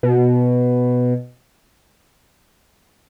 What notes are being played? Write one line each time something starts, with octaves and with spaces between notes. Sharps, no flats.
B2